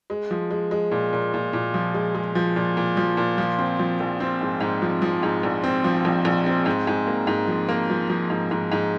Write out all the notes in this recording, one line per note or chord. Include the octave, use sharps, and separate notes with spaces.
G#3
F3
G#3
G#3
A#2
A#2
A#2
A#2
F3
G#3
G#3
F3
A#2
A#2
F3
A#2
F3
C4
F3
A#1
C4
G#2
G#2
F3
F3
G#2
A#1
C4
F3
A#1
A#1
C4
G#2
G#2
A#3
G#2
F3
A#3
F3
F3
G#2
G#2
G#2